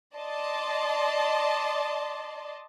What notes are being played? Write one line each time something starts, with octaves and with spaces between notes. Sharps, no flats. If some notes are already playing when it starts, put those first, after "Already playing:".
D5 D#5 A5 C6